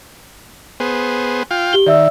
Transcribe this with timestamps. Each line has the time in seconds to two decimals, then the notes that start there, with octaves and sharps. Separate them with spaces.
0.80 B3 G#4 C5
1.51 F4 F5 G5
1.73 G4 G7
1.86 D#3 D5 E5 E6